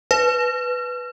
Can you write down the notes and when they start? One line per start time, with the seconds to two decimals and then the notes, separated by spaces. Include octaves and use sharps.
0.11 B4